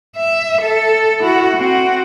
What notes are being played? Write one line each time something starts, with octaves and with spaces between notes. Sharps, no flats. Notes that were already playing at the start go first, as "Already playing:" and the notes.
E5
A4
E4 F#4
C4 F#4